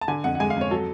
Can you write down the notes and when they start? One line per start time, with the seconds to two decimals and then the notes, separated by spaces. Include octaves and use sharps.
0.01 A5
0.08 D3 G#5
0.24 F2 F#5
0.35 F#5
0.40 G#3 G#5
0.50 F5
0.56 F2 C#5
0.71 F#3 A4